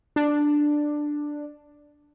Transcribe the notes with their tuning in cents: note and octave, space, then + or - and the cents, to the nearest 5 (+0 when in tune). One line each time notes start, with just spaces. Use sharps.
D4 +5